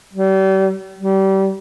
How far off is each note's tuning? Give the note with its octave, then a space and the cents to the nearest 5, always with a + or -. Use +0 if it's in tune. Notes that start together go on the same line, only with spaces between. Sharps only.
G3 -35
G3 -25